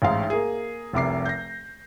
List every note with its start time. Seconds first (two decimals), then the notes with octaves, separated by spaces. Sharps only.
0.02 A1 G#2 F5
0.30 A#3 G#4
0.93 F1 C2 D6 C7
1.26 G6 A#6